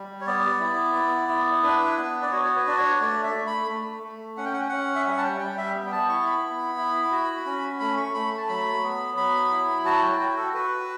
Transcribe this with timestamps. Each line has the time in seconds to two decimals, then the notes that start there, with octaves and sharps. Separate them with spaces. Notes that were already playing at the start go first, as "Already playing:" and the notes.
Already playing: G3
0.21 C#5
0.26 B3 D5
0.60 E4
0.95 B3
1.29 E4
1.63 D4 B4
1.97 B3
2.22 D5
2.31 F#4 C#5
2.45 C#5
2.55 B4
2.67 D4 D5
2.78 C#5
3.00 A3 D5
3.23 E5
3.35 A3
3.47 B5
3.69 A3
4.03 A3
4.37 C#4 F#5
4.45 G5
4.53 F#5
4.60 G5
4.69 C#4 F#5
4.96 E5
5.06 G3 F#5
5.18 A5
5.24 G5
5.40 G3 G5
5.57 E5
5.74 B3
5.86 G5
5.92 A5
6.09 E4 C#6
6.26 B5
6.43 B3
6.77 E4
7.12 F#4
7.46 C#4
7.80 A3 B5
7.97 C#6
8.14 A3 B5
8.38 A5
8.49 F#3 B5
8.83 B3
9.17 F#3 B5
9.51 E4
9.85 F#4 A5
10.02 G5
10.20 F#4 G5
10.37 A4
10.54 F#4 B4